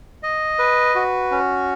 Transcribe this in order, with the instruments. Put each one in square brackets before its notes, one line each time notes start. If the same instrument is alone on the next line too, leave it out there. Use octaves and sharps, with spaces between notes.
[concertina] D#5
B4
F#4
C#4